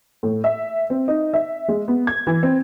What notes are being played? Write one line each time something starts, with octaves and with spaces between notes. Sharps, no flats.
A2
E5
C4
D#4
E5
G#3
B3
G#6
E3
C4